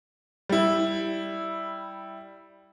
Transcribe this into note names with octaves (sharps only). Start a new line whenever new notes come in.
G3 E4